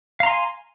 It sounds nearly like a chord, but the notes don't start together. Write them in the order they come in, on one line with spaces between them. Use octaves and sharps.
F5 A#5 C6 G#5